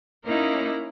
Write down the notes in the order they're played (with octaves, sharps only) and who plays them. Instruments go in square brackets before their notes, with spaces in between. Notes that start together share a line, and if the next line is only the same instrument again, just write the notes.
[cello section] A#3 C#4 D#4 [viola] E4 A#4